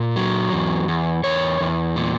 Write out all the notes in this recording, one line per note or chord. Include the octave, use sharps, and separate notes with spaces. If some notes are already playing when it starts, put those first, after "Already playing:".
Already playing: A#2
F#3
E2
E2
E2 C#5
E2
A#2